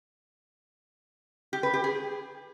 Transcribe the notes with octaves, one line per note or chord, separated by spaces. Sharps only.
G4
B4
G4
G#4